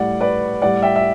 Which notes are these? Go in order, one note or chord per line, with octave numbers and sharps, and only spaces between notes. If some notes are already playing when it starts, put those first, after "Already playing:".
Already playing: A2 G3 D5 F#5
B4 D5
A2 G3 D5 F#5
E5 G5
E5